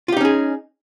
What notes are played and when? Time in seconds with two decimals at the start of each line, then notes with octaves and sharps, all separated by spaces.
0.08 F4
0.12 G4
0.17 D#4
0.21 C#4
0.25 G#4